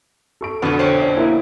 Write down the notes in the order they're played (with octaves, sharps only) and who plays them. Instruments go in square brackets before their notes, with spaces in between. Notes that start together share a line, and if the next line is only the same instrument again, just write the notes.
[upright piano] A4 C#6 D7
[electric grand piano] F2 B2 D3 [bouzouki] B3 F#4
[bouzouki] C4 C#4
[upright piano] C#5
A#3 E4